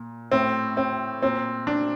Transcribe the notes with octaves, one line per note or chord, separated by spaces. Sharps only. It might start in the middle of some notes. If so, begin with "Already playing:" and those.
Already playing: A#2
A2 C4
C4
A#2 C4
D4